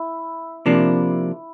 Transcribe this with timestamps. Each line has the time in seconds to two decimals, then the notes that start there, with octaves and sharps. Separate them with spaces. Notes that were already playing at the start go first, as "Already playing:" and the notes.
Already playing: E4
0.66 C3 F3 A#3 D4